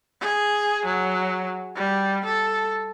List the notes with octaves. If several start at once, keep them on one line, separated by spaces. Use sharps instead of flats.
G#4
F#3
G3
A4